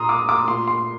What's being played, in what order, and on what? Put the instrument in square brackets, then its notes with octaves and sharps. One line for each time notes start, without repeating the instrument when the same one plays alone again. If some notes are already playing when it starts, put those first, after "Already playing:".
Already playing: [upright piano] A#2 A#5 C6 D#6
D6
D6
A#2 C6
C6